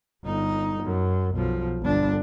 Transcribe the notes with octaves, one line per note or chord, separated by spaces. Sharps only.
G1 D#4
F#2
B1 F3
G1 D4